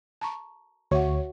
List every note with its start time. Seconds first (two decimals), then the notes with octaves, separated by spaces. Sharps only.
0.21 A5 A#5 C#6
0.91 D2 F#4 C#5 E5 F#5